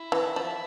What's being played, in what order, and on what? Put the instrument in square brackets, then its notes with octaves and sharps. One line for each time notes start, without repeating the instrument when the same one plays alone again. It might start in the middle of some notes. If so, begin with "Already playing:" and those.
Already playing: [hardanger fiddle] E4
[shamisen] E3
F3